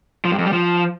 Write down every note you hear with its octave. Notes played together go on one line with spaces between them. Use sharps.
F3
G2
F2
G3
F3